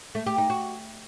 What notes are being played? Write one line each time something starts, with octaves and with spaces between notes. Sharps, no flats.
A3
G4
D#4
F#4